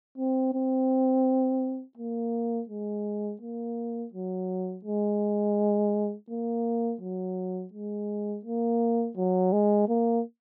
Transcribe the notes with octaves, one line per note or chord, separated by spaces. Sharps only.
C4
C4
A#3
G#3
A#3
F#3
G#3
A#3
F#3
G#3
A#3
F#3
G#3
A#3